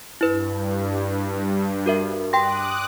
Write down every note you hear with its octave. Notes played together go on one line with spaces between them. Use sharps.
G2 E4 B4
F#4 A#4 E5
G5 C6 D6 D#6 F#6 A#6